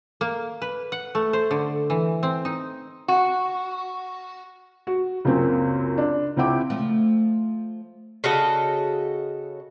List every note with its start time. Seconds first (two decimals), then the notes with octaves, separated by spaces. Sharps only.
0.21 A#3
0.62 B4
0.92 F#5
1.15 A3
1.33 C5
1.51 D3
1.90 E3
2.23 C4
2.45 D#4
3.08 F#4
4.87 F#4
5.25 C#2 F#2 A#3 C4 C#4
5.98 D4
6.37 C#2 C4 E4 F#5 G5 D6
6.70 F3 A3
8.24 C#3 F#4 A4 D#5